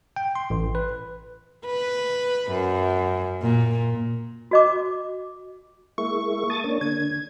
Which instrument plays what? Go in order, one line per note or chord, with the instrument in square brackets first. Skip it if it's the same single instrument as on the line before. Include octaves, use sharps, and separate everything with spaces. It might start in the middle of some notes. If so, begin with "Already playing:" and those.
[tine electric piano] G5
C6
A1
B4
[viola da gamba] B4
F#2
A#2
[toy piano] F#4 D#5 D6
[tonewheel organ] G#3 A#3 E4 [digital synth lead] C#6
[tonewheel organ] A5 D#6 A6
A#3 C#4 D4
[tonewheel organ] D3 [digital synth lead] G#6